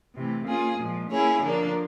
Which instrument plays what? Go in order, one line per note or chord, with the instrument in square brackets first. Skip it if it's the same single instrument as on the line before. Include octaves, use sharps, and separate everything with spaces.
[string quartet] C3 E3 A3
A#3 C#4 F4 G#4
A#2 F3 G#3
A#3 C#4 E4 G#4 C#5
D3 F3 A#3 D4